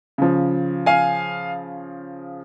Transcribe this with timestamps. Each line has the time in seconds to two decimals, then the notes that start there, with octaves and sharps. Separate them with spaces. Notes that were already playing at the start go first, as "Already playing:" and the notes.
0.18 C#3 F3
0.86 F5 G#5